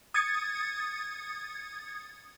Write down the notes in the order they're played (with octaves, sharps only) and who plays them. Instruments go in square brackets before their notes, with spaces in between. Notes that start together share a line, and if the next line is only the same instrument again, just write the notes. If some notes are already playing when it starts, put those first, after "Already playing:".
[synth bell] D#6 G#6 A6 C#7